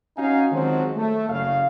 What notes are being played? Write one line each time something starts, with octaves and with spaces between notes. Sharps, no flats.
C#4 D#4 F#4 F5 G#5
D#3 F3 F#3 G#3 C4
A3
F#1 C#3 F5